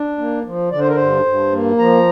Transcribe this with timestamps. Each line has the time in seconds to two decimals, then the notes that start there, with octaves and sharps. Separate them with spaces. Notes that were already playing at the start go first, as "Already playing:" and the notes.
Already playing: D4
0.18 A#3
0.45 F3
0.72 D3 D5
0.80 C5
0.88 A#4
0.96 G2 C5
1.25 G2
1.52 A#3
1.79 F3 A#5